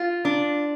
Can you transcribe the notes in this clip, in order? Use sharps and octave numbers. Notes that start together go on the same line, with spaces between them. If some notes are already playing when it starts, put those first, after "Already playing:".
Already playing: F4
D4